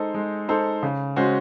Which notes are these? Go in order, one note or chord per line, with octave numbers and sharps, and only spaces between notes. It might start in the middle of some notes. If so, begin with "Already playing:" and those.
Already playing: G#3 D#4 A4 C5
G#3
D#4 A4 C5
C#3
G#3 C#4 F#4 C5